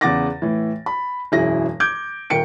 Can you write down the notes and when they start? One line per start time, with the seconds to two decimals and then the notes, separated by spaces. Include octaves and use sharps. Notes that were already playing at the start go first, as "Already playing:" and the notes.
0.01 E2 C#3 F#5 D6 A6 A#6
0.42 A2 E3
0.86 B5
1.32 E1 F#2 E4 G#4 A#6
1.80 D6 G6 G#6 D7
2.30 D#1 A#4 G5 C#7 D7